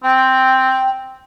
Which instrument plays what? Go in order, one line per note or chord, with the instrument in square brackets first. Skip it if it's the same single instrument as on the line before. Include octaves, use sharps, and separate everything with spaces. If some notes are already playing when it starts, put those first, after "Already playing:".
[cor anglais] C4 [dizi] G5